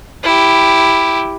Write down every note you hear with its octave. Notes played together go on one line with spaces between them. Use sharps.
E4 G4